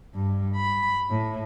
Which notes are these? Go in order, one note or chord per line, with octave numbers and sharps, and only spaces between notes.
G2
B5
A2